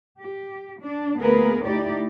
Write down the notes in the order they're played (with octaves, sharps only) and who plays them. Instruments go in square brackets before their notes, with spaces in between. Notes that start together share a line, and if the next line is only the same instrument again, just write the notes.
[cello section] G4
D4
D2 A#3 B3 G#4 A#4 B4
A3 D#4 E4 G4 D5